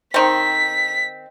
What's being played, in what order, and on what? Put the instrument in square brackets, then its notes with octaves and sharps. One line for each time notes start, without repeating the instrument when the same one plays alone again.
[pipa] D#3 C4 [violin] B6